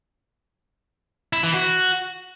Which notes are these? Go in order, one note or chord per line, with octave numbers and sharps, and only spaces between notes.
E4
E3
F#4